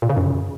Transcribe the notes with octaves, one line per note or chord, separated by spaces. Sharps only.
A#2
C#3
F#2